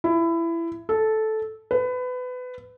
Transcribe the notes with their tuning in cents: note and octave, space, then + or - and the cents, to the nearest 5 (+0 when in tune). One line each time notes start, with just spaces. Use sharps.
E4 +20
A4 -10
B4 +25